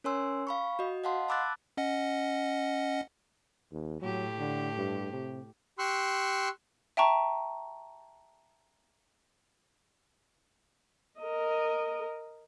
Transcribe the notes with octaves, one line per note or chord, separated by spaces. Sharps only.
C#4 A#4 C#5 G#5 C6 E6
F5 B5 C#6
F#4 D#5
D#5 F5 F#5 A5 C6
A5 B5 D6 E6 F#6 A6
C#4 D#5 F#5
D#2
A2 F#3 G4
D3
G2
C3
G4 C6 C#6 E6 F#6
E5 G5 A5 A#5 C#6
A#4 D#5